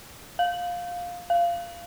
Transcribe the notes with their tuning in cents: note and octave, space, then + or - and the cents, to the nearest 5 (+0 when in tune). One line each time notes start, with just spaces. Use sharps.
F5 +15
F5 -15